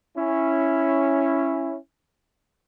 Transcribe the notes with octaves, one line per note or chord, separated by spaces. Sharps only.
C#4 E4